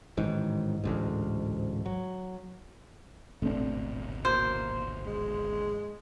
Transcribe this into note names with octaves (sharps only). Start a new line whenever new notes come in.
A1 G#2 D#3
A1 D2 G#2
F#3
D1 G#1 B2 A3 C4 D4
A#3 F#4 C5
G#3